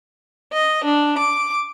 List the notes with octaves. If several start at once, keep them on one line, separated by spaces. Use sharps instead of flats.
D#5
D4
D6